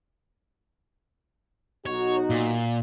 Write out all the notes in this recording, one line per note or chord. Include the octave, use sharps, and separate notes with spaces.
B1 D#4 F#4 C#5
A#2